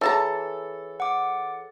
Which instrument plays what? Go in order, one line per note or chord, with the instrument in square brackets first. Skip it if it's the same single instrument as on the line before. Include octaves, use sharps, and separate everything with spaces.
[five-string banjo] E3 A5 A#5 [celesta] G#4 C#5 [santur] A4
[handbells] F#5 D6